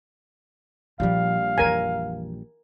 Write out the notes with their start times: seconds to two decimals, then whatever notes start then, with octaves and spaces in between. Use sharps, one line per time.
1.00 A#1 A#2 F3 G3 F5
1.58 F2 E3 A#4 G#5